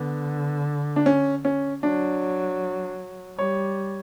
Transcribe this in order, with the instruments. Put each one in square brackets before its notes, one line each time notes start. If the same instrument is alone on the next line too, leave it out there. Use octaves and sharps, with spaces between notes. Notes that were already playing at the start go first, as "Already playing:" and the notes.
Already playing: [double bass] D3 [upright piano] B3
[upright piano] D4
C#4
C#4
[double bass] F#3 [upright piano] D4
[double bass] G3 [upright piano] C#5